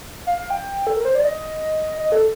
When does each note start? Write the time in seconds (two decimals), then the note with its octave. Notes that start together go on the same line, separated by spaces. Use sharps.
0.27 F5
0.50 G5
0.87 A4
0.96 A#4
1.05 C5
1.15 D5
1.24 D#5
1.98 D#5
2.12 A4